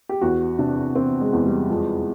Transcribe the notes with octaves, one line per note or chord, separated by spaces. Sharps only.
G4
E2 F#4
C3 D4
E3 C4
G#3
E2
G3
F2 G#3